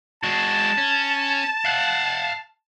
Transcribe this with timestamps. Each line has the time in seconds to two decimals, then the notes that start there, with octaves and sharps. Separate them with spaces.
0.23 G#3 F#4 A5
0.78 C#4
1.65 F5 F#5